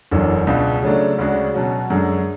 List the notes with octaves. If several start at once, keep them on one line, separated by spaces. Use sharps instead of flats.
F#1 E2 D3 F#3
C#2 B2 G#3 D4
C#3 F#3 A3 D4
D2 C#3 G#3 D4 F#4
B2 F#3 C#4 F#4
F#2 D3 G#3